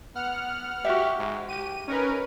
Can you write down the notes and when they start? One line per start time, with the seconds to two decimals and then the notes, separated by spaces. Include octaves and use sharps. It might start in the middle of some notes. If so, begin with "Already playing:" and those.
0.15 B3 F#5 F6
0.85 F#4 G4 E5
1.18 G#2
1.49 G4 D#7
1.88 C#4 D#4 A#4 B4